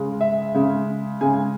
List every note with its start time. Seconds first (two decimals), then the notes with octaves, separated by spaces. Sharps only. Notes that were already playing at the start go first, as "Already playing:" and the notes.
Already playing: C#3 G#3
0.21 E5
0.54 C#3 G#3
1.21 C#3 G#3 G#5